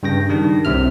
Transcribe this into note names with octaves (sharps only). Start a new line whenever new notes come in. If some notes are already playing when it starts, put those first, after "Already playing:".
G2 C#3 G5 A#6
D#3 G3 D4
C2 C3 E5 F6